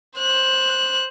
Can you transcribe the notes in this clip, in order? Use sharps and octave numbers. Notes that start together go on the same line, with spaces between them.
C5 F#6